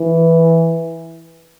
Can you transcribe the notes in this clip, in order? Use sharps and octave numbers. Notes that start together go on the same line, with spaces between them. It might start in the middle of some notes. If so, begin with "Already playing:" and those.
Already playing: E3